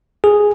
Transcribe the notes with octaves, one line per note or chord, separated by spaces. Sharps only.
G#4